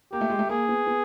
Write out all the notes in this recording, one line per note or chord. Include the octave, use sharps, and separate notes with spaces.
A#3 G4
A3
G#3
A3
A#3 G#4
B3
B3